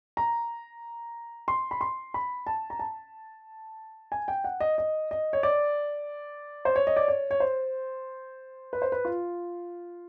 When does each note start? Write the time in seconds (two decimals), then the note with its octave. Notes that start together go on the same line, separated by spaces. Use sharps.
0.17 A#5
1.48 C6
1.71 B5
1.81 C6
2.14 B5
2.47 A5
2.70 A#5
2.79 A5
4.12 G#5
4.28 G5
4.44 F#5
4.60 D#5
4.78 D#5
5.11 D#5
5.33 C#5
5.43 D5
6.65 C5
6.76 C#5
6.87 D#5
6.97 D5
7.08 C#5
7.31 C#5
7.40 C5
8.73 B4
8.82 C5
8.92 B4
9.05 F4